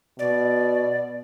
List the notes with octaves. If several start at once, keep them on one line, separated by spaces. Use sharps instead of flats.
B2 D5